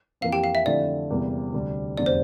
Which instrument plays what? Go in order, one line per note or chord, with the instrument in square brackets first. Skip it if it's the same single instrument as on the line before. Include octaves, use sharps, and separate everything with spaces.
[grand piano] F2 E3 A#3 [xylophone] F5
[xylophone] G4 G5
F5
E5
[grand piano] F2 D3 A3 E4 [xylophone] D5
[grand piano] E2 C3 G3 A#3 E4
D2 C3 G3 D4
[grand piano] F1 E2 D3 G3 [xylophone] D5
[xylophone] C5